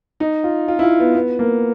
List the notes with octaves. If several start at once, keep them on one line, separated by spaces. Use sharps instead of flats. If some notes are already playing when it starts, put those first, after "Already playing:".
D#4
F4
F4
E4
F4
B3
B3
A#3